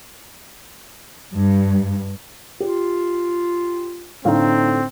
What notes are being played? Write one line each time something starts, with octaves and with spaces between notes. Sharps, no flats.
G2
F4 G4
A2 D3 C4 D#4 F5